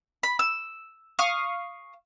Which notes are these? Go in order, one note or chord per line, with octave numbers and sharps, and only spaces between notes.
B5
E6
F5 C#6 D#6